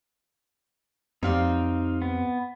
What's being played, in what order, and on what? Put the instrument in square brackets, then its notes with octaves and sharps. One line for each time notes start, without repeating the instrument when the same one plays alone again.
[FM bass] F2 [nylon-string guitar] C4 G4 D5 [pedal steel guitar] D#4 F5
[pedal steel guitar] B3